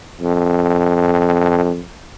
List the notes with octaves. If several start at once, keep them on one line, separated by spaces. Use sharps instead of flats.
F2